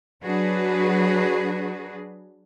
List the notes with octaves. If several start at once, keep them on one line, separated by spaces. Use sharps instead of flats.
F#3 D4 F#4 G#4 B4